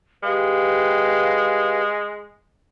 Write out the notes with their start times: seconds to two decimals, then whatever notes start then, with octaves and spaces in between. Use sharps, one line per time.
0.23 G#3 G4 B4 F5